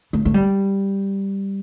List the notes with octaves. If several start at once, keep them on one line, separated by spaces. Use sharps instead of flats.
A3
A3
G3